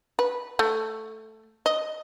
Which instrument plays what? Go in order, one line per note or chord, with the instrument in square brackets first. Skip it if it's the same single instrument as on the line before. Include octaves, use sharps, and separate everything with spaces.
[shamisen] B4
A3
D#5